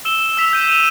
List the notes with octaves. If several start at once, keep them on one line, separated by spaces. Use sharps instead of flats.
E6 E7 G7
E6 B6 F7
G6 D#7
D#7 F7